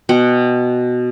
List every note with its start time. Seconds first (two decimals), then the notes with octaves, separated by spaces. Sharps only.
0.09 B2 F#5 G5